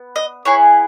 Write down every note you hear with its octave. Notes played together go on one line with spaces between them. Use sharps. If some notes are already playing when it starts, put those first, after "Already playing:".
Already playing: B3
D#5
B3 E4 G#4 C#5